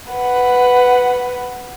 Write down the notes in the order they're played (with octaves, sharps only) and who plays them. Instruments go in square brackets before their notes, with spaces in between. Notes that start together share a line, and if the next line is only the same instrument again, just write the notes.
[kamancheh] B4 F#5